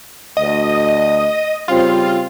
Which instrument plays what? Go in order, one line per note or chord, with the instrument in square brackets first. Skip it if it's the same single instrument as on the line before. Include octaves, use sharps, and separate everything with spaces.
[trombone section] D2 [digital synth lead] D#5
[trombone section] C#3 G3 C4 [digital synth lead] F4